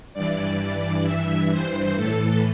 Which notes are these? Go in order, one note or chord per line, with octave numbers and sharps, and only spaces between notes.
G2 E3 D5
D5
E5
C5
A2 E3 A4